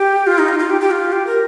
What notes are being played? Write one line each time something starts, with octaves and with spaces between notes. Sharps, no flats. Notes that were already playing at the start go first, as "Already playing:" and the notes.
Already playing: G4
F4
D#4
F4
F4
G4
G4
F4
G4
A#4